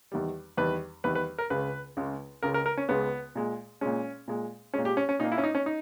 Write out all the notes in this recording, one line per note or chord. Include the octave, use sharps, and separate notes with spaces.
E2 D#3 G3
E2 D#3 G3 B4
E2 D#3 G3 B4
B4
A#4
C#2 C#3 G#3 B4
C#2 C#3 G#3
C#2 C#3 G#3 A#4
A#4
A#4
C#4
C#2 C#3 G#3 B3
A#2 G#3
A#2 G#3 C#4
A#2 G#3
A#2 G#3 C#4
G4
C#4
C#4
A#2 A#3 D#4
E4
C#4
D#4
C#4
D#4